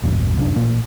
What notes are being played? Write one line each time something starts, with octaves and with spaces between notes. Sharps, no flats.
A1 E2 G2 B2
F1 C2 F#2 D4
A1 A#2 A#3